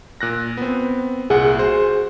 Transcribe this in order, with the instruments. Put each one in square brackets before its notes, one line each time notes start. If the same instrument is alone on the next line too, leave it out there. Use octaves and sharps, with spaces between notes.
[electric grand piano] A#2 F#6 A#6
B3 C4
[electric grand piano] C2 A#2 F#5 [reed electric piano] G#4
[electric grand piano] F#4 C5